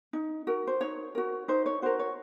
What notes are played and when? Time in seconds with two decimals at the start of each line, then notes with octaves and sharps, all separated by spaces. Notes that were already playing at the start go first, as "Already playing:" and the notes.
0.13 D#4
0.47 F#4 A#4
0.67 C5
0.81 D#4 C#5
1.15 F#4 A#4
1.48 D#4 C5
1.66 C#5
1.82 F#4 A#4 C5
1.99 C#5